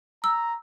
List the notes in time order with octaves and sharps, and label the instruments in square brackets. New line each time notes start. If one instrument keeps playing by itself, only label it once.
[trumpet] A#5 [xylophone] E6